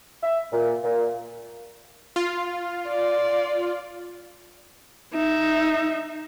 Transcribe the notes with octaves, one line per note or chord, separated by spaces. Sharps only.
E5
A#2
A#2
F4
D5
D#4 E5